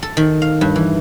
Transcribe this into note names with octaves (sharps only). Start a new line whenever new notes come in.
A4
D#3
F5
G2
E3